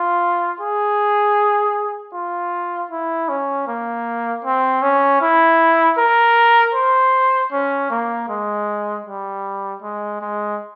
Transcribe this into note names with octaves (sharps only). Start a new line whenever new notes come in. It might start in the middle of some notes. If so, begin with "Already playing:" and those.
Already playing: F4
G#4
F4
E4
C#4
A#3
C4
C#4
E4
A#4
C5
C#4
A#3
G#3
G3
G#3
G#3